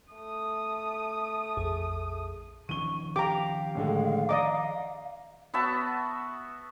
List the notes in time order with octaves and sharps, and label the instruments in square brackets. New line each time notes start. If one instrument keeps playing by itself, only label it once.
[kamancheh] A3 D#6
[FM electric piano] A#1 F2 G#4
[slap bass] D#3 F3 C#4 [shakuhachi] C#6 [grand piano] D#7 G7
[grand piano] G4 [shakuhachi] F5 [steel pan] A#5 D6
[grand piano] A2 D3 G#3
[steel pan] D5 D#5 D6 [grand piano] A#5
[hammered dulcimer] B3 F#4 E5 A5